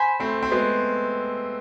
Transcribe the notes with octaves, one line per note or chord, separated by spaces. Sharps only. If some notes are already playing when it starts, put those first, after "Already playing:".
Already playing: C5 G#5 B5
A3 C4
C4
G#3 B3